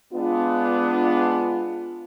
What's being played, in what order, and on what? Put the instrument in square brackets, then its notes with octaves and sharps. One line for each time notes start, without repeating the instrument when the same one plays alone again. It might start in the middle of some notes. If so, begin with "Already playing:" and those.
[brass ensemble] G#3 B3 D4 F4